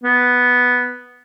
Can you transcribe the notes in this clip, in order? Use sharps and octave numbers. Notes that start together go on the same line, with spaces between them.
B3